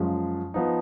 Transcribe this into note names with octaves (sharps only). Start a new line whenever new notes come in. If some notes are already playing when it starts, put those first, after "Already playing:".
Already playing: F#2 C#3 F3 G#3
F3 B3 D#4